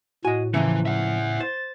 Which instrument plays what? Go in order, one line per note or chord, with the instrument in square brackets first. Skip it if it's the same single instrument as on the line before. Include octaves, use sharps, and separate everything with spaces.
[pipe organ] A2 [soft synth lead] F#4 [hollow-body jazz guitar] D#5 G#5
[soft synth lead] C#3 [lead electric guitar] E3 [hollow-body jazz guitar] F3 A#3 E4
[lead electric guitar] E5 F#5
[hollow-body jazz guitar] C5 [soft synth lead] A6